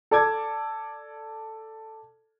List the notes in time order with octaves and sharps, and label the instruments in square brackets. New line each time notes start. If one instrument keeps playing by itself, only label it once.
[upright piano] A4 D5 A5 D6 E6 G#6